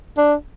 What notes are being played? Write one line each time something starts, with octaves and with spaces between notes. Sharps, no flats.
D4